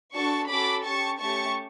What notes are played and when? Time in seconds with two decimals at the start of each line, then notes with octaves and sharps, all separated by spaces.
0.14 D4 F#4 A4 A5 C#6
0.49 C#4 F#4 A4 B5 D6
0.85 C#4 G4 A5 C#6
1.20 A3 C#4 G4 A5 C#6